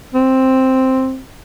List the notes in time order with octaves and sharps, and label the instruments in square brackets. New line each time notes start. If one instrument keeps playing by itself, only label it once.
[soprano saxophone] C4